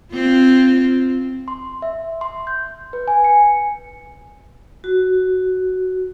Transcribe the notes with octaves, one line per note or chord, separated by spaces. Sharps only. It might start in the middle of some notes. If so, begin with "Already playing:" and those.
C4 F4
C6
E5
C6
G6
B4
G#5
C#7
F#4